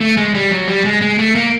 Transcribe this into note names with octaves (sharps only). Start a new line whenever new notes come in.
A3
G#3
G3
F#3
G3
G#3
G#3
A3
A#3